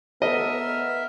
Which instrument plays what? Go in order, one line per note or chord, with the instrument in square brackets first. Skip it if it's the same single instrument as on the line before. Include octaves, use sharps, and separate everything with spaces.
[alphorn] B3 [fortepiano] A4 D#5 [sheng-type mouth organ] A#4 E5